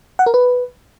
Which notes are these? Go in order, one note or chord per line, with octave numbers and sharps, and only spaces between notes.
F#5
A#4
B4